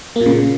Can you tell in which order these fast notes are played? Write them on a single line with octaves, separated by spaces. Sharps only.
A#3 A#2 C#3